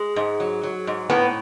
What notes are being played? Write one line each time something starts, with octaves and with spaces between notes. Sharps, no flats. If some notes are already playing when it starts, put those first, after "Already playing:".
Already playing: G#3
G#2
F#3
F#3
G#2
A2 B3